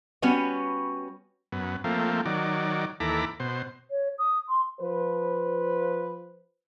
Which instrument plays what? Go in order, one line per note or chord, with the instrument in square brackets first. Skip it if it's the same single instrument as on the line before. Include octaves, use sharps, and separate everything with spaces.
[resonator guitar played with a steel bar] G3 B3 C#4 F#4 B4 C#5
[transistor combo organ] F#2 B3
F3 A3 A#3 C4
D#3 F#3 D5
D#2 E3 A4 A#5 B5 D6
B2 C5
[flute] C#5
D#6
C6
[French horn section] F3 B4 C5